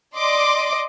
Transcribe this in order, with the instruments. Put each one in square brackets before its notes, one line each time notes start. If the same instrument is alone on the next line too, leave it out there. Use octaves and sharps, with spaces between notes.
[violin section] D5 D#5 C6 D6